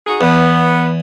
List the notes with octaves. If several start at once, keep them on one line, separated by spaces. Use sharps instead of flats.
D#4 F#4 G#4
E2 B3